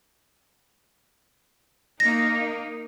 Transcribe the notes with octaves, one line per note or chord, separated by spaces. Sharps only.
A#3 D#4 A#6